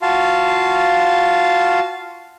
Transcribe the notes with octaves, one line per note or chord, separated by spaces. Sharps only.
F4 F#4 F5 A5